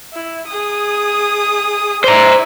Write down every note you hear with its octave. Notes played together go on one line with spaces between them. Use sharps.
E4
G#4 D#6
E4 C5 D5 A#5